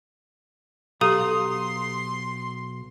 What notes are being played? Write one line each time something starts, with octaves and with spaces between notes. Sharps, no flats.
B1 G4 A4 F5 A#5 C6 D#6 D#7